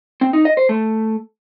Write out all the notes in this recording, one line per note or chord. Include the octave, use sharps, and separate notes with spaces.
C4
D#4
D#5
C5
A3